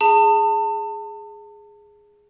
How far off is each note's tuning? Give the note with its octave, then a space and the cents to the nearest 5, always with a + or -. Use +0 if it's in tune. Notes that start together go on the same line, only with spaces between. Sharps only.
G#4 +0 A5 +30